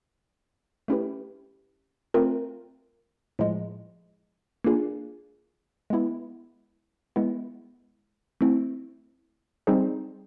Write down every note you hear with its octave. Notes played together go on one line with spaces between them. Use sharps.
A3 C#4 E4 G4 B4
A3 C4 F4 A#4
A2 F3 G#3
A#3 D4 F4 G#4
G#3 B3 E4
G#3 B3 E4
A3 C4 E4
G3 C4 D#4 G#4 C5